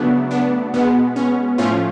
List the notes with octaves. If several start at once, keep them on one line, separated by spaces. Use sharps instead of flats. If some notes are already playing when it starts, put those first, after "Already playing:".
Already playing: C#3 F#3 A3 B3 D4
B3 D4
B2 G#3 B3
C#4
A2 F3 A3 C#4 F4